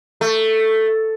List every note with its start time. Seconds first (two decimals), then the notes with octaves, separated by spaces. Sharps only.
0.21 A3